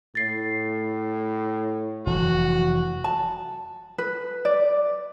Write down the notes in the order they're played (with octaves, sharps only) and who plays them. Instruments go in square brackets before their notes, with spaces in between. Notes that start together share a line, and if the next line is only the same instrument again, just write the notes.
[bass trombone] A2 [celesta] A6 C7
[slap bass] F1 E3 F#3 [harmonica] F#4
[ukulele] A5
B4
D5